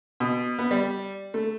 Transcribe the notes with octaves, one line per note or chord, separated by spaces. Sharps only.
B2
B3
G3
A3